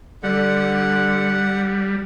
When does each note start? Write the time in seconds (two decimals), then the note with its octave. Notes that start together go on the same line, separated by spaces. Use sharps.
0.23 D3 G3 F#5